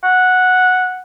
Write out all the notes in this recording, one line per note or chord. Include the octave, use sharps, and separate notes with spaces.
F#5